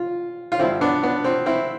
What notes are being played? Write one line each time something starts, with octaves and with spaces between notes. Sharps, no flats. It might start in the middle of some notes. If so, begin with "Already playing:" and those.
Already playing: F4
F4
G2 D3 C4 E4
B3 D4
B3 D4
C4
C4 E4